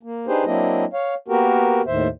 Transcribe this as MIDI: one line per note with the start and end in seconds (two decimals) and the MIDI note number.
0.03 0.27 58
0.27 0.44 62
0.27 0.44 63
0.27 0.44 67
0.27 0.44 68
0.27 0.44 71
0.27 0.44 72
0.45 0.85 54
0.45 0.85 58
0.45 0.85 60
0.45 0.85 62
0.45 0.85 64
0.45 0.85 75
0.93 1.14 73
0.93 1.14 77
1.28 1.81 58
1.28 1.81 59
1.28 1.81 66
1.28 1.81 67
1.28 1.81 70
1.87 2.08 39
1.87 2.08 45
1.87 2.08 51
1.87 2.08 72
1.87 2.08 76